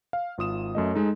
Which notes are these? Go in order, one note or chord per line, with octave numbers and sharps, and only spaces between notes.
F5
G#1 F4 D#6 E7
F#2 A3 D#5
G#3 D#4 A4